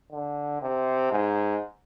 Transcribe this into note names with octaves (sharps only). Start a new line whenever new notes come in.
D3
C3
G#2